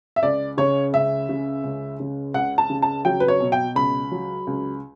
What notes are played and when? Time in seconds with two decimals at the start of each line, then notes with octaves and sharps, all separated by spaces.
0.16 E5
0.22 C#2 D5
0.57 C#3 C#5
0.93 C#2 E5
1.29 C#3
1.64 C#2
2.00 C#3
2.34 C#2 F#5
2.58 A5
2.70 C#3
2.82 A5
3.05 F#3 G5
3.20 B4
3.28 C#5
3.40 B2
3.52 G5
3.75 C#2 B5
4.11 F#3
4.47 C#2